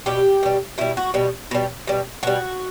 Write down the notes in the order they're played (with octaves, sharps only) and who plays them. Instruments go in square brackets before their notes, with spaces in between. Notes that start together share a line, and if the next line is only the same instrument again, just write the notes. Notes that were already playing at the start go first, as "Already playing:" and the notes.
[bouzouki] B2 G3 G4
B2 G3
B2 G3 E4
F#4
B2 G3
B2 G3
B2 G3
B2 G3 F#4